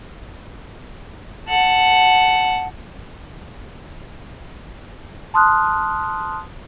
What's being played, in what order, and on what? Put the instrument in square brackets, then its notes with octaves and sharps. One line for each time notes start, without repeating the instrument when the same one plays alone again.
[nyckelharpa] F#5 A5
[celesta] A5 C6 D#6 F6 F#6